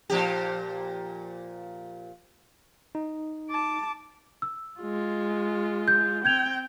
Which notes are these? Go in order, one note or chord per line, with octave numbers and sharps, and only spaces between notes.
A#2 F3 G4
D#4
A5 D6
E6
G#3 F4
G6
C4 G5 G6 G#6 F7